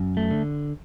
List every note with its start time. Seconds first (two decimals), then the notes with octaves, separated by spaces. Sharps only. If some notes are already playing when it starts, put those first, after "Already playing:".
Already playing: F#2
0.17 A3
0.31 D3